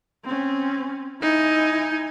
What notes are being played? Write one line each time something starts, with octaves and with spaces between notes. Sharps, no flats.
C4 C#4
D#4 E4 G#5